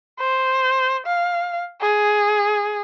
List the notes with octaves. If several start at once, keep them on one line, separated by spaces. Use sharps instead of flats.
C5
F5
G#4